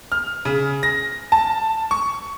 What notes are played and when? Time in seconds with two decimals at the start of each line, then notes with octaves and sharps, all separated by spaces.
0.12 F6
0.45 C#3
0.83 A#6
1.32 A5
1.91 C#6